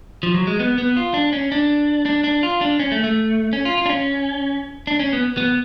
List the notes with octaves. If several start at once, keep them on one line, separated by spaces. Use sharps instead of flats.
F3
F#3
G#3
B3
B3
F4
D4
C#4
D4
D4
D4
F4
D4
C#4
A3
A3
C#4
F4
F4
D4
C#4
D4
C#4
B3
B3